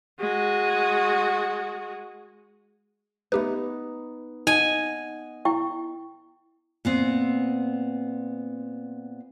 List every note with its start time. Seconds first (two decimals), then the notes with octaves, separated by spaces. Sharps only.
0.20 G#3 F#4
3.32 A3 B3 D#4 G4 B4
4.47 D#4 D#5 F#5 G#5
5.45 E4 G5 C#6
6.85 A#2 B3 C4